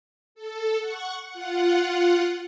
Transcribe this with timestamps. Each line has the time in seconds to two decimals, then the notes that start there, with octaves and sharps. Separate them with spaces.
0.35 A4
0.80 F#5 C#6
1.30 F4 F#5